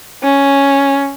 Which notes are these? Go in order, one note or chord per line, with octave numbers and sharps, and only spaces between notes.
C#4